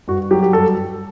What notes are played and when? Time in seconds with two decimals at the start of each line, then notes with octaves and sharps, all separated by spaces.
0.08 G2 F#4
0.31 F#3 G4
0.42 G4
0.53 G2 A4